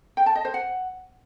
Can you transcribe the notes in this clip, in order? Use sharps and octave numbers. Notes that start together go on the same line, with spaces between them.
G5
A5
D#5
C5
F#5